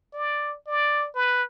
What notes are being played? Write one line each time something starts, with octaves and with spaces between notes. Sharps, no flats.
D5
D5
B4